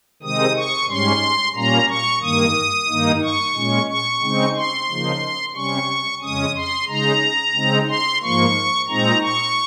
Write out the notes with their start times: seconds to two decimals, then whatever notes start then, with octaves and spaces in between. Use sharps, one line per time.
0.22 C3 D#3 G#3 C4 D#4 D#6
0.56 C#6
0.89 G#2 G3 C#4 C6
1.56 A#2 G3 A#3 C#4 A#5
1.89 C#6
2.22 G2 D#3 A#3 D#6
2.88 G2 D#3 A#3 D#4
3.22 C#6
3.56 A#2 G#3 C#4
3.89 C#6
4.22 C#3 G#3 C4 D#4
4.56 C6
4.88 C#3 F3 A#3 D#4
5.55 C3 G3 C#4 C#6
6.22 F2 C#3 G#3 C#4 D#6
6.55 C6
6.88 C#3 G#3 D#4 A#5
7.55 C#3 G#3 C4 D#4
7.88 C6
8.22 G#2 F3 A#3 C#6
8.88 A#2 G#3 C4 D#4 A#5
9.21 C#6